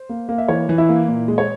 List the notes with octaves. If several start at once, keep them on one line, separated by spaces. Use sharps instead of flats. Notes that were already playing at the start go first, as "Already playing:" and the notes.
Already playing: C5
A#3
A#3
E5
E3 C#5
E3
E4 E5
A#3
A#2
G#3
C#5